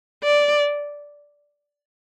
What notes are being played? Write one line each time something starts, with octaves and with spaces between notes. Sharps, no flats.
D5